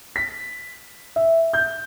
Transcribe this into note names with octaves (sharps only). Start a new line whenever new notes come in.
B6
E5
G6